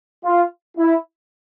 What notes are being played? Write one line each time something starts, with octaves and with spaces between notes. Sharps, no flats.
F4
E4